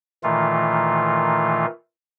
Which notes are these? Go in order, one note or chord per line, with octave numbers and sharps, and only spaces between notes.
A#2 D#3 E3 A3 F4